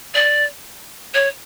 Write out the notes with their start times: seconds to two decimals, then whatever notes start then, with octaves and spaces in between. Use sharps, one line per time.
0.14 D5
1.14 C#5